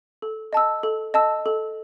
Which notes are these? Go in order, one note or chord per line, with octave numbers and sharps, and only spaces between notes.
A4
D#5 A5 E6
A4
D#5 A5 E6
A4